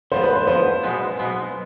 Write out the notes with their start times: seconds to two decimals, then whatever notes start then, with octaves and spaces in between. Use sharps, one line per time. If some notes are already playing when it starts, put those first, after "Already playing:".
0.12 G#2 F3 B3 C5
0.23 B4
0.36 C5
0.47 G#2 F3 B3 C5
0.83 B1 B2 G#3 B3
1.19 B1 B2 G#3 B3